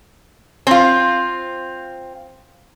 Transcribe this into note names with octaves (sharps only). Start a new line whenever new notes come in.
C4 F4